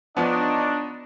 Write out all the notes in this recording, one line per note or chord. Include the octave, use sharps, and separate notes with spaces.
F3 B3 D4 D#4 C#5 D#5